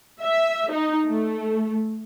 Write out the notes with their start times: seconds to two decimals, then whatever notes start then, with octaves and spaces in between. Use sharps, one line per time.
0.21 E5
0.71 D#4
1.05 A3